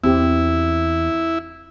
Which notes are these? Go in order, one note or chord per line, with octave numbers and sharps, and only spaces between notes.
E2 C4 E4 G4